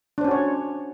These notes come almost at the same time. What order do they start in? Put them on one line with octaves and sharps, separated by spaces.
D4 C5 C#4 F#4 C#5